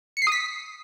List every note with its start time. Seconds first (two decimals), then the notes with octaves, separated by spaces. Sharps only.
0.17 C#7
0.22 C7
0.27 D#6
0.32 B6